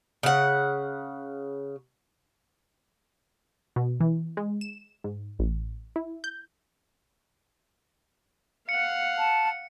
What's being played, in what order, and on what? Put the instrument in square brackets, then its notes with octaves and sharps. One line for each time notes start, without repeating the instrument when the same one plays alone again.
[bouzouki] C#3 F#5
[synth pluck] B2
E3
G#3
E7
G#2
A1
E4
G6
[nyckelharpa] F5 F#5 [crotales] C#7
[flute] A5